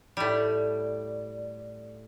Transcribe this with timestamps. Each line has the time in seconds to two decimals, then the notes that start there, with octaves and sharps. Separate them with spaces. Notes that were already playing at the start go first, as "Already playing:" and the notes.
0.17 A2 G3 D5